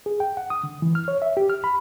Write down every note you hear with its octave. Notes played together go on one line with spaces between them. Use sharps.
G#4
G5
F#5
D#6
D3
E3
F6
C#5
E5
G4
F6
B5